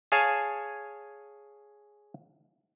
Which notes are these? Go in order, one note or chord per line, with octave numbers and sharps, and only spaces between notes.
G#4 C#5 F5 G#5 A5